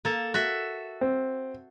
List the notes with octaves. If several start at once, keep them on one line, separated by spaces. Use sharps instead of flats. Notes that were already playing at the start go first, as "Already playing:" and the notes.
A#3 A4
F#4 A4 E5
C4